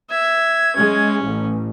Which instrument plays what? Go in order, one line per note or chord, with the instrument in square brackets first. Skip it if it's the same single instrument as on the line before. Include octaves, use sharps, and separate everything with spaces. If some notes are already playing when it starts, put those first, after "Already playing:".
[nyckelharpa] E5 [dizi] G#6
[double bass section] G#3 [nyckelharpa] C#4
[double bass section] A1